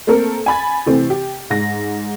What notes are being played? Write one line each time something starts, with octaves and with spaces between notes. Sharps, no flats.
A3 A#3 C4 A4 A#4
G#5 B5 A6
C3 E3 A3 C4
G4
G#2 A#6